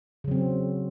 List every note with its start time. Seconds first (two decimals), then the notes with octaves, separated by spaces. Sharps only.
0.24 C#3
0.28 F#3
0.31 C4